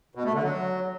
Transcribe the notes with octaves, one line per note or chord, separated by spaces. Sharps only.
B2
A3
D3
F#3